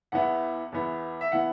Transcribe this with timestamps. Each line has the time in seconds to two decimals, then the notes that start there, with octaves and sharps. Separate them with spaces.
0.12 E2 E3 B3 E4 F#5
0.72 E2 E3 B3 E4
1.21 E5
1.32 E3 B3 E4 F#5